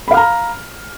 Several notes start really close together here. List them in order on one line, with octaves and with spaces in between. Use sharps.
B5 F5 F6 A#5